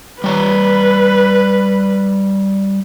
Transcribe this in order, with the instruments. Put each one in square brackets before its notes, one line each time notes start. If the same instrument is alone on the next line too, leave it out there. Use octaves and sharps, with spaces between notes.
[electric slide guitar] G3 C#5 D5 [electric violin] B4